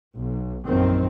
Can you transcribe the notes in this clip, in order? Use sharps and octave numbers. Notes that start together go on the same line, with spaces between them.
B1
A#1 F#2 D#3 C4